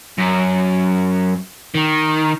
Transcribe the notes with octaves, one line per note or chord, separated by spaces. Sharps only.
F#2
D#3